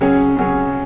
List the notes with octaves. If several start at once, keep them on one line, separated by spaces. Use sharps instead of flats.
C#3 F#3 C#4 G#4 C#5
C#3 F#3 C#4 G#4 C#5